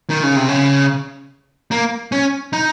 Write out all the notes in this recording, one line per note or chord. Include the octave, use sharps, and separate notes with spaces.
D#3
C#3
C3
C#3
A#3
C#4
D#4